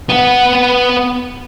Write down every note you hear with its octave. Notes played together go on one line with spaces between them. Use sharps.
B3 F#5